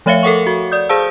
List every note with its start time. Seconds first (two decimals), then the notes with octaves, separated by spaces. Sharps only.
0.06 F3 A3 C#5 E5 F5 C#7
0.23 A4 A#4 F#5 C#6
0.47 F#4
0.72 D5 D#6 G6
0.89 G#4 C5 F5 A5 E6